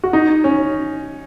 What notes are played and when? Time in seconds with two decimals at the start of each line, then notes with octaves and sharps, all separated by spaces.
0.04 F#4
0.13 D#4
0.44 C#4